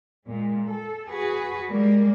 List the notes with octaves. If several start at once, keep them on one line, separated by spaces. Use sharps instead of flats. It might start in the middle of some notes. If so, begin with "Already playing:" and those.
A#2 G#3
A4
F#4 G#4 B4
G3 G#3 A#3